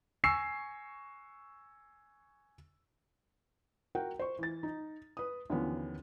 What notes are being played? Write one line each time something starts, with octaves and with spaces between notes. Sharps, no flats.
G#5 C#6 E6 C7
F#4 A#4 F#5 G5
C5 C#6
E3 A6
D#4
B4 D#6
D#2 D3 E3 F3 B3 C#4